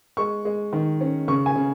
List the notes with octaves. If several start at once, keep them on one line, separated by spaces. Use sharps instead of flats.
G#3 C#6
G#3
D#3
C#4
C#3 C#6
G#5
C#3